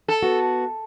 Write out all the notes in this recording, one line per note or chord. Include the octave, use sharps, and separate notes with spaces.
A4
B3 F#4